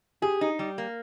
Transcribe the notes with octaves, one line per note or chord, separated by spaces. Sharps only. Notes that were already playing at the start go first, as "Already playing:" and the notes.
G4 G#4
D#4
G3
A#3